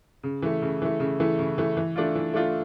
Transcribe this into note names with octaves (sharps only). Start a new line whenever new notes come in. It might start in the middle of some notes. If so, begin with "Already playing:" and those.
C#3
E3 A3
C#3
E3 A3
C#3
E3 A3
C#3
E3 A3
E3
A3 D4 F4
E3
A3 D4 F4